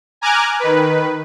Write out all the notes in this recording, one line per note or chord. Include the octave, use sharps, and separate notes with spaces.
G#5 A#5 D6 F6 F#6 G#6
D#3 B4